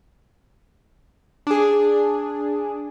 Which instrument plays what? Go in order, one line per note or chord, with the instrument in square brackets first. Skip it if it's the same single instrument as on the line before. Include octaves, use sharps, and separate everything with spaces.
[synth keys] D4 G#4